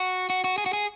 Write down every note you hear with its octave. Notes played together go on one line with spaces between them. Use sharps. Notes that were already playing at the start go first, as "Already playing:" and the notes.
Already playing: F#4
F#4
F#4
G#4
F#4
G#4